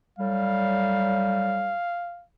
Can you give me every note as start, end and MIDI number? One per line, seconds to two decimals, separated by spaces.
0.19 1.74 45
0.19 1.74 54
0.19 1.74 55
0.19 2.25 77